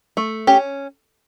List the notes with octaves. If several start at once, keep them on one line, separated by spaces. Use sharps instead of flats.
A3
C#4 G4